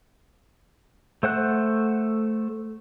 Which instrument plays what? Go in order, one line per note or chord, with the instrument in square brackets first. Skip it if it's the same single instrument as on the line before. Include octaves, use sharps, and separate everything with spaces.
[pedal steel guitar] A3 C5 F#5 F#6